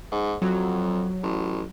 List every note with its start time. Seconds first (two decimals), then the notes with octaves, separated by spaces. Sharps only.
0.12 G#2
0.42 F2 F#3
1.23 A1